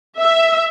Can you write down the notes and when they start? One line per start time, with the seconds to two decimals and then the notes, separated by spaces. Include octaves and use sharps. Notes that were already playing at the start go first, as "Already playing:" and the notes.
0.19 E5